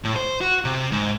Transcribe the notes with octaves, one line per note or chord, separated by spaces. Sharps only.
A2
C5
F#4
C3
G#2